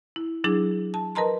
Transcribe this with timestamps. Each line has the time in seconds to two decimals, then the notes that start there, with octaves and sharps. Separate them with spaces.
0.16 E4
0.44 F#3 D4 E4 G#4
0.94 A5
1.15 A#4 B4 D#5 A5 A#5 C6